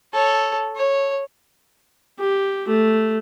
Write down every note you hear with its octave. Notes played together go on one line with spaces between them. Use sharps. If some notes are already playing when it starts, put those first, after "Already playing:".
A4 C#5
C#5
G4
A3